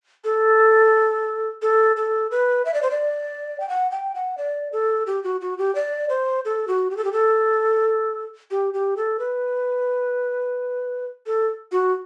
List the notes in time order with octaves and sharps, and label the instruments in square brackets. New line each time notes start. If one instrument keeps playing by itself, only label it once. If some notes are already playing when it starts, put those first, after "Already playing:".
[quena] A4
A4
A4
B4
E5
D5
C5
D5
G5
F#5
G5
F#5
D5
A4
G4
F#4
F#4
G4
D5
C5
A4
F#4
G4
A4
G4
A4
G4
G4
A4
B4
A4
F#4